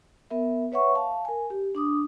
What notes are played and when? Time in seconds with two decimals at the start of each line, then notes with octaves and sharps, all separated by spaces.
0.30 B3 A#4 E5
0.72 B4 C#5 E5 F#5 C#6
0.95 F5 A5
1.25 A#4 G#5
1.50 G4
1.75 D4 D6 D#6